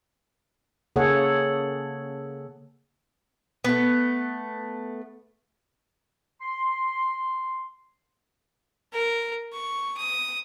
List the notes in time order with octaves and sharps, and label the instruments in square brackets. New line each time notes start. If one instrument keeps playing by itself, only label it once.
[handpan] C#3 A#3 G#4 A4 C#5 F#5
[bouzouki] A3 B3
[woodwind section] C6
[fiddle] A#4
C#6
D#6